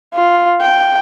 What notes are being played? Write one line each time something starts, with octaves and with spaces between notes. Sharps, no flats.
F4
G5